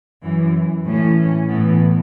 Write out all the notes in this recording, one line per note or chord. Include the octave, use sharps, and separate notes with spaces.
F#2 E3
A2 E3 C#4
A2 E3 B3